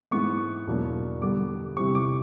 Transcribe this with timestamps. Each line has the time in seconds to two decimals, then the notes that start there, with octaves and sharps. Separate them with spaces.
0.11 G#2 E3 G#3 B3 C#6
0.67 E2 B2 F#3 A#3 D4
1.22 G2 D3 G3 B3 D6
1.77 C3 E3 G3 C4 C#6
1.95 D6